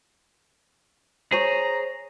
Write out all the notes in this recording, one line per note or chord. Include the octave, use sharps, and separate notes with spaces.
G#4 C5 C#5 A#5